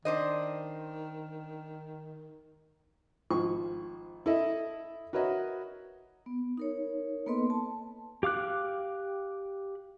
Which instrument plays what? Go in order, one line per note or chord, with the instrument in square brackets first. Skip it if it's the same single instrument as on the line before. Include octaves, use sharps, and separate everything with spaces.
[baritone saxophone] D#3 [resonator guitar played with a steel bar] D4 C5 D#5
[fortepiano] G#1 F3 C#6
E4 A4 D#5 E5
F#4 A#4 B4 C#5 D#5 E5
[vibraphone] B3
D#4 A#4 C#5
A#3 B3 A4 B4 D#5 C6
A5
[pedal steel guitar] G4 F5 D6 F#6